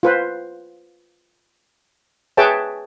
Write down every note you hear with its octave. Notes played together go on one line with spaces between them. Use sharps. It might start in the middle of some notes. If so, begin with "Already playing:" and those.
F4 B4 C5
G#4 B4 C#5 E5 G5 A5